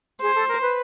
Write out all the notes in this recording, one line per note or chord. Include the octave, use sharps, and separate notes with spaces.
G#4 C5
A4
A#4
B4